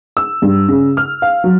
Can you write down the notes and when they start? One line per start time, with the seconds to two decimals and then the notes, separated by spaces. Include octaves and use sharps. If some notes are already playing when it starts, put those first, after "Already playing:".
0.17 E6
0.42 G2
0.68 C#3
0.97 F6
1.22 F5
1.44 F#3